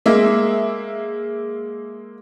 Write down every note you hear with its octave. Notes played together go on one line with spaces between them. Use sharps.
G#3 A#3 E5